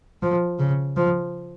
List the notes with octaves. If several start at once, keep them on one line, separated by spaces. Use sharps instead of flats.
F3
C#3
F3